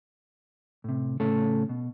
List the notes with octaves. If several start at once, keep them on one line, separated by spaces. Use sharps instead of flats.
A2 C3
A2 C#3 A3 C#4 A4
B2